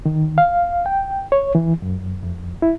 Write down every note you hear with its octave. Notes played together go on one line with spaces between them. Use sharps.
D#3
F5
G5
C#5
E3
F#2
F2
E4